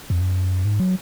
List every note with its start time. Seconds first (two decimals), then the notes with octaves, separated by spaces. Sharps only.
0.10 F2
0.21 F#2
0.65 G#2
0.80 F#3